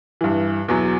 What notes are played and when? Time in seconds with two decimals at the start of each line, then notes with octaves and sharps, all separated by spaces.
0.21 G2 E3
0.68 E2 B2 F#3